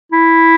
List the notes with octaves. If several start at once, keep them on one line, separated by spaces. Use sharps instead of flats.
E4